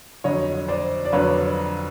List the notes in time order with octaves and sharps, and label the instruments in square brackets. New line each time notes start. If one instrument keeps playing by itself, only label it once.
[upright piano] F2 D3 F#3 C#5 D#5
C5 D5
D5
F2 D3 F#3 B4 C#5